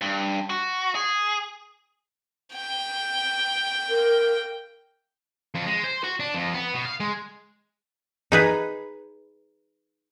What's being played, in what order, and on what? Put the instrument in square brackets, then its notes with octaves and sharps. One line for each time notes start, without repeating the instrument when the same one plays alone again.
[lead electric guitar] G2
F#4
G#4
[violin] G5
[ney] A#4
[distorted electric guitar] F2
G#3
C5
F#4
D4
F2
B3
B2
F5
G#3
[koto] D#4 G#4 B4